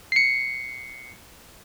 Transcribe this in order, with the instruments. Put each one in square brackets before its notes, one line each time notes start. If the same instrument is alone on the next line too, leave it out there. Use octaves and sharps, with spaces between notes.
[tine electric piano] C7 C#7